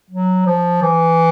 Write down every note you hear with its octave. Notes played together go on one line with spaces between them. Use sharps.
F#3
F3
E3